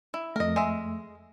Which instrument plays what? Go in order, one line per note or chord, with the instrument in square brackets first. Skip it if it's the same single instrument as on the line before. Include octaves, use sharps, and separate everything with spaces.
[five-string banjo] E4
[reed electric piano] F2 A3 [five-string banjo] A#4 D#5
[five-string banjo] G#3 E5